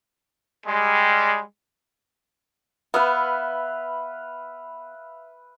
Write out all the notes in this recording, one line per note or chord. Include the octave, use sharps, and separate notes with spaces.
G3 G#3
B3 B4 E5 F5